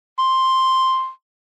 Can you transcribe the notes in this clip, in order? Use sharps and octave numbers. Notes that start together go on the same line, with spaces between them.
C6